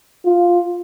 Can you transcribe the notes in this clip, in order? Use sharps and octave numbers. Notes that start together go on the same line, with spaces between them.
F4